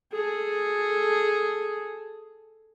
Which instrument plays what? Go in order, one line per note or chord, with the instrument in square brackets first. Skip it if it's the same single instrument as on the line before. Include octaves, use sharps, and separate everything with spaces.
[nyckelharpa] G#4 A4